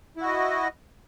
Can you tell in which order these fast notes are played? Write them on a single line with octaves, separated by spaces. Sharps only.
E4 F#4 D#5